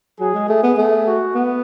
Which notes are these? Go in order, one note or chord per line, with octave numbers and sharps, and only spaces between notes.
F#3 G#4
G#3
A3 G#4
B3
A3
F#4
B3